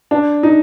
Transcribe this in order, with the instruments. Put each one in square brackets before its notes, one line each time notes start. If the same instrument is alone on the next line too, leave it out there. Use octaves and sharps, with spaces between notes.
[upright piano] D4
D#4